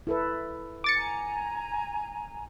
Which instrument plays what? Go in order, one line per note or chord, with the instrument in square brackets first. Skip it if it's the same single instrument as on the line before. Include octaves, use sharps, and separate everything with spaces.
[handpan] E4 A4 B4
[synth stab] D6 A6 C#7
[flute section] G#5 A#5